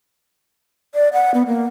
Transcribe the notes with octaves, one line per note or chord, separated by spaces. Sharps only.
D5
F#5
B3
A#3